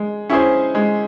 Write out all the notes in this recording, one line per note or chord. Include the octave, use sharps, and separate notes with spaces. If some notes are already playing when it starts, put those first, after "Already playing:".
Already playing: G#3
C#4 E4 G#4 C5
G#3